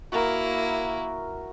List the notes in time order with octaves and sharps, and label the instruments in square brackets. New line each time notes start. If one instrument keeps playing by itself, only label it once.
[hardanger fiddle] A#3 E4 [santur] F#4 A#4